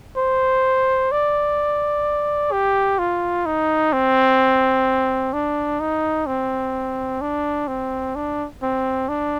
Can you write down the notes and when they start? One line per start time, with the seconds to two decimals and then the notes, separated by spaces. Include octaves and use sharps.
0.16 C5
1.11 D5
2.52 G4
2.99 F4
3.46 D#4
3.93 C4
5.33 D4
5.80 D#4
6.27 C4
7.22 D4
7.68 C4
8.15 D4
8.62 C4
9.08 D4